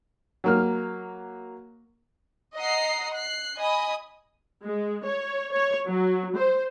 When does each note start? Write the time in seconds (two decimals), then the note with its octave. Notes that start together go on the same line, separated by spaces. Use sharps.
0.44 F#3 A#3 F6
2.55 D#5 F#5 A#5 C7
3.13 F#6 C7
3.56 D#5 G#5 B5 D#6
4.64 G#3
5.05 C#5
5.52 C#5
5.88 F#3
6.36 C5